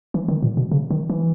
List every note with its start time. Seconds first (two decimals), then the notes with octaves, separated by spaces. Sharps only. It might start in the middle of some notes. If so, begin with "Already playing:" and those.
0.14 E3
0.28 D#3
0.43 A#2
0.57 B2
0.71 C#3
0.90 D#3
1.10 E3